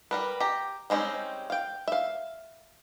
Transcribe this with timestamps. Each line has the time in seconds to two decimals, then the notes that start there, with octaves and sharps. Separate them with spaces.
0.11 G3 A#4 B4
0.40 G4 A#5
0.90 G3 G#3 C4 C#4 D#4
1.50 F5 G5
1.88 E5 F5